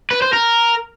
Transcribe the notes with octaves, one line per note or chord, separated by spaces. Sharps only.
B4
C5
A#4